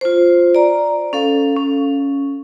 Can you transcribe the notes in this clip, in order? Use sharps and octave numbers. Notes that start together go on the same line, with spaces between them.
F4 C5
D5 A#5
C#4 A4 F5
C#4